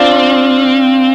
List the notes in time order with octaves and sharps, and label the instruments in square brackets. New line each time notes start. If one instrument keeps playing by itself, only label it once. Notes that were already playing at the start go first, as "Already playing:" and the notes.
Already playing: [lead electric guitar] C4 [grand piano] D4 F4